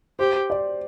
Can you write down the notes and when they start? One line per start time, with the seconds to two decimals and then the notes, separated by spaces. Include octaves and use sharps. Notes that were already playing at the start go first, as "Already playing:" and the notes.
0.19 G4 C5
0.50 D5